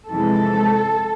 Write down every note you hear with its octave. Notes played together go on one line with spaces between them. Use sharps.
F2 C3 E3 G#3 A4